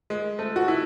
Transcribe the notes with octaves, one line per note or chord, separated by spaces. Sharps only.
G#3
A3
F#4
E4